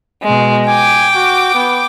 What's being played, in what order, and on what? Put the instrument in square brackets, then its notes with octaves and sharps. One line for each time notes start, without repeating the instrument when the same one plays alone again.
[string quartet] B2 G#3
[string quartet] G5 D6 [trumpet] G#5
[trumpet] F#4
B3